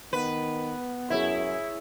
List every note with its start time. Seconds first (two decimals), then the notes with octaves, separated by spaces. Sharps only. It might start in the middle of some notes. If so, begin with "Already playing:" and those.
0.13 D#3 B3 B4
1.10 F#2 E4 G#4 C#5 E5